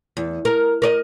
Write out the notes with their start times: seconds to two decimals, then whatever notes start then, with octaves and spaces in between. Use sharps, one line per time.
0.17 E2
0.45 A#4
0.82 A#4 D5 D#5